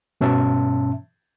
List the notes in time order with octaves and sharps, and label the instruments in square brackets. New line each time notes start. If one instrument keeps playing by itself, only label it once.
[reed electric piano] G2 B2 C#4 E5 A5